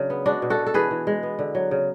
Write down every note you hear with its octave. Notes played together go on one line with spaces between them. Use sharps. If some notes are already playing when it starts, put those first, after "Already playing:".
Already playing: C#3 F#3 D4
B3
G#3 D4 F#4
B2
F#4 A4
B2
A4
E3 G#4 B4
E3
G#3
B3
D3
F#3
C#3